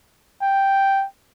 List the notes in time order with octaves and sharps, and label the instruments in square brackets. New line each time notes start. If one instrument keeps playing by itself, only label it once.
[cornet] G5